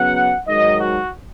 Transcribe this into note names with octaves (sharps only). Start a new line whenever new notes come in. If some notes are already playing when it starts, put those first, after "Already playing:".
Already playing: C#3 F#3 B3 F#5
G#2 D#3 F#3 D#5
F#4